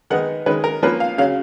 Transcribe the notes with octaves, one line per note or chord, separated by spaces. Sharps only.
D#3 G#3 B3 D#4 F#5
D#3 G#3 C#4 B4
A#4
F3 A#3 C#4 B4
F5
C#3 F#3 C#4 F5